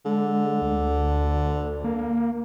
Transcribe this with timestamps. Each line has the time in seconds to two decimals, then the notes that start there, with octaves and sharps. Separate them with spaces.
0.05 D3 G#3
0.62 D2
1.84 A#3